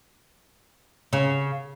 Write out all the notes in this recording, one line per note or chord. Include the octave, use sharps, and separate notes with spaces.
C#3